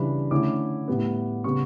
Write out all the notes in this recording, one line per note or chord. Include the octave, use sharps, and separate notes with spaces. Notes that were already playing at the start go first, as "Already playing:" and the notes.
Already playing: C#3 E3 G3 D4 B5
D3 A3 C#4 E4 D6
A2 G3 B3
C#3 G3 B3 C#6